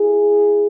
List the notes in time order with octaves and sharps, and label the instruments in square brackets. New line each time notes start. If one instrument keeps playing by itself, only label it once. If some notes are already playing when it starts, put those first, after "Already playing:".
Already playing: [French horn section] E4 G#4